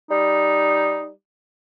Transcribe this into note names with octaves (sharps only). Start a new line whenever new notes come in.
G3 D#4